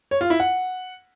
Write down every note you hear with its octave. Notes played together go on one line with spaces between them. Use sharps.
C#5
F4
E4
F#5